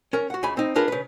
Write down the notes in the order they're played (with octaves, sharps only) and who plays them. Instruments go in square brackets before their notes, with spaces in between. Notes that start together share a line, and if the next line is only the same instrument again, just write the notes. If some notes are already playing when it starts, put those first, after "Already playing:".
[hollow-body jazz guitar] C#4 A#4
F#4 F#5
C#2 C#3 G#5 B5
C4 D#4
D4 F4 G#4 A#4 B4
C#3 B4